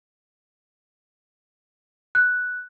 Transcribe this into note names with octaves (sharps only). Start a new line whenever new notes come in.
F#6